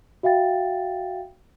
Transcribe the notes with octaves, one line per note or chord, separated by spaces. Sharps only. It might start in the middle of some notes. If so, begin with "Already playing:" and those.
F#4 E5 F5 G5 A6